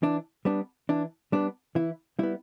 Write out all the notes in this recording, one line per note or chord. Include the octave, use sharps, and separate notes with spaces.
E3 D4
G3 B3 D4
E3 D4
G3 B3 D4
E3 E4
G3 B3 E4